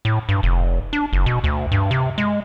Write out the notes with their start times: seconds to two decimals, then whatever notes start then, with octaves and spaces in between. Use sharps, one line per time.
0.05 A2
0.29 G2
0.43 F1
0.93 D4
1.13 F#1
1.26 B2
1.44 D2
1.72 G2
1.91 C3
2.18 G#3